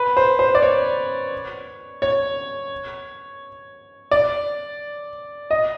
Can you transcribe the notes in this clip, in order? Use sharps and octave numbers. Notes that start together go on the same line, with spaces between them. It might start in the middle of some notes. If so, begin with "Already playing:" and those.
Already playing: B4
C5
C5
D5
C#5
C#5
D5
D#5